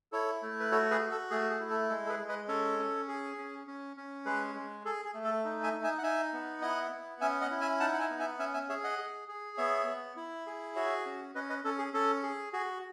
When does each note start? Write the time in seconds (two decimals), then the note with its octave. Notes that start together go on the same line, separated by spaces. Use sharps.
0.12 E4 A4 C#5
0.42 A3
0.60 B4
0.71 F#4 A4 C#5
0.91 G#4 B4
1.01 F#4
1.11 A4
1.31 A3 G#4
1.50 G#4
1.60 E4
1.70 A4
1.89 G#3 A4
2.06 A4
2.09 G#4 B4
2.19 G#3
2.29 B4 D#5
2.48 C#4 A4 C#5
2.79 C#4
3.08 G#4
3.38 C#4
3.67 C#4
3.97 C#4
4.26 G#3 G#4 B4
4.55 G#3
4.85 G#4 A4
5.05 G#4
5.14 A3
5.24 A4
5.45 D#4
5.63 E5 G#5
5.73 D#4
5.84 E5 G#5
5.98 F#5
6.03 D#4 E5 G#5
6.33 B3
6.62 E4 D#5 F#5
6.91 B3
7.21 C#4 E5 G#5
7.41 D#5 F#5
7.51 E4
7.61 E5 G#5
7.80 D#4 F#5 A5
7.93 F#5
7.99 E5 G#5
8.10 B3
8.19 E5 G#5
8.39 C#4 E5 G#5
8.54 E5 G#5
8.69 G#4 C#5 E5
8.84 D#5 F#5
8.99 G#4
9.28 G#4
9.58 B3 C#5 E5
9.87 B3
10.17 E4
10.47 G#4
10.76 F#4 C#5 E5
11.06 C#4
11.35 C#4 B4 D#5
11.50 B4 D#5
11.64 C#4 A4
11.79 G#4
11.93 C#4 A4
12.23 G#4
12.53 F#4 G#4